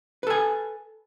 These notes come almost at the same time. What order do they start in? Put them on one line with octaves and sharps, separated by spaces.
B4 A4 G#5